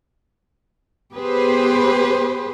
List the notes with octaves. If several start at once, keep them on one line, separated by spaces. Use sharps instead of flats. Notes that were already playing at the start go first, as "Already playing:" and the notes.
B3 G4 G#4 B4 C5